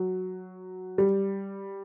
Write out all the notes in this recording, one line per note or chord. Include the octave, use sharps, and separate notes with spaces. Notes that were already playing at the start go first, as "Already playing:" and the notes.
Already playing: F#3
G3